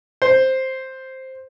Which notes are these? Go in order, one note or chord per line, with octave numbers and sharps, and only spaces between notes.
C5